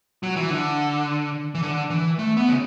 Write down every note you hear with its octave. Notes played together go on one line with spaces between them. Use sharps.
F#3
E3
D3
E3
D3
E3
A3
B3
C#3